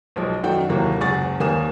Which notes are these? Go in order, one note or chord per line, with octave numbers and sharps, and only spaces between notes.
B1 F3 G#3
F#2 D#3 A3 D4 F#4 G5
D#2 C3 E3 F#3 A#3
F#1 C#2 G#4 F#5 C#6 A6
G#1 D#2 A#3 G#5 D#6 E7